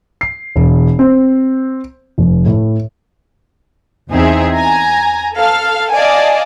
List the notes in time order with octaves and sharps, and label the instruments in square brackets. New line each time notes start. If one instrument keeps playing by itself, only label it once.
[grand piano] C7
E1
C4
F1
A2
[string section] E2 C4 D#4 G#4 E5
G#5 A#5
A4 F5
D5 D#5 F5 G#5 A5